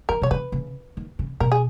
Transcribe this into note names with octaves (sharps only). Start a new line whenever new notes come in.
D#3 A#4
B2 C#5
C#3 B4
C#3
D#3
C#3
B2 A#4
G#4